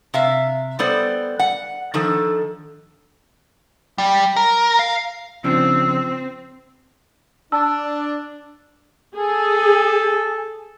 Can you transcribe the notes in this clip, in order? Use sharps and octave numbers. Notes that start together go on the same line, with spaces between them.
C3 E5 F5
G3 B3 A4 C5 D5
F#5
D#3 F3 D4 A4
G3
A#4
F5
C#3 F3 C4 D4 E6
D4 A5 E6
G#4 A4